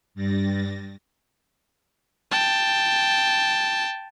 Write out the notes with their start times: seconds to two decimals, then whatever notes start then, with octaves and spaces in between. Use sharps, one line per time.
0.15 G2 G3 A6 A#6
2.31 G5 A5